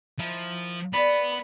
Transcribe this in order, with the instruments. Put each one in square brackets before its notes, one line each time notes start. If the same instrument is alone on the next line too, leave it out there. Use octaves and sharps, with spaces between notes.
[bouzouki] D#3 E4 E5 [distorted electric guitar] F3
[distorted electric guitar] B3 [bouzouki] D5 [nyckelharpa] B5